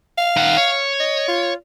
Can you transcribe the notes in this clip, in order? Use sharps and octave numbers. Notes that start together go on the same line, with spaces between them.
F5
D#3 F#5
C#5
D#5
F4